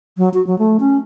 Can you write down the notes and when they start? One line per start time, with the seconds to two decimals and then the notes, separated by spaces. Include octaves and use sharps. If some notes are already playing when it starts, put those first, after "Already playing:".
0.18 F#3
0.34 F#4
0.47 F#3
0.59 A3
0.80 C#4